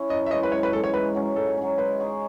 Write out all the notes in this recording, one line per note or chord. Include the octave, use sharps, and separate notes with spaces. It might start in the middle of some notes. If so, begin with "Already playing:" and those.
Already playing: C#4 E4
F#2 D#5
E5
E3 G#3 C#4 D#5
B4
F#2 C#5
B4
E3 G#3 C#4 A4
C#5
G#2 B4
F#3 C#4
G#2 A4
F#3 C#4
G#3 B4
D#4 G#4 C#5